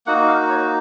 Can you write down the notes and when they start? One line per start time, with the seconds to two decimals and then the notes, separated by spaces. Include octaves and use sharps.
0.07 A#3 D#4 F#4 F#5
0.28 F5
0.50 C#5